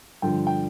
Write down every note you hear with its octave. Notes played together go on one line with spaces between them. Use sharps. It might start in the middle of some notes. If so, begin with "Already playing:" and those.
G2 D3 F3 G5
G5